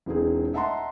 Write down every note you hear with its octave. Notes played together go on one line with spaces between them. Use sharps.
E1 E3 C4 D#4 G#4
D#5 E5 F#5 A5 A#5 C6